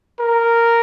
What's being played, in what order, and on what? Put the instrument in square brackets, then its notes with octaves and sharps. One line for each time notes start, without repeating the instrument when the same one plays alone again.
[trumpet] A#4